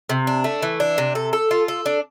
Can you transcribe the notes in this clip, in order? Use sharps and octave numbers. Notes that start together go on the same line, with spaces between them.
C3
D4
A3
E3
D4
C3
A4
A4
F4
A4
D4